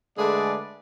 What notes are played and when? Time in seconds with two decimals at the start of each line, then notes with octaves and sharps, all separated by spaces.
0.18 D3 G#3 A3 G#4 B4 D5